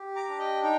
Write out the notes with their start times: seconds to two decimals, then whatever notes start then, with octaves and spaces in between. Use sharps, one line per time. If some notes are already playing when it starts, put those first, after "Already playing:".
Already playing: G4
0.16 A#5 D6
0.28 D4
0.39 D#5 G5
0.63 D#4 G5